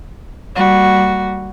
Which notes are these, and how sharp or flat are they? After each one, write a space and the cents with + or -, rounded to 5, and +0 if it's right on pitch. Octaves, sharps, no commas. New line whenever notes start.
G3 -10 A#3 -30 F#4 +0